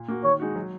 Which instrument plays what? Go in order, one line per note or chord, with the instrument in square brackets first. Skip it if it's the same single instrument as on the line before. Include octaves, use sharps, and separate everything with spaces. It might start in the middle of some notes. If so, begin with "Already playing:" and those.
Already playing: [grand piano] A#2
A#3 F#4
[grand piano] D#3 [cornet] C#5
[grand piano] G#3 D#4 F#4
F#3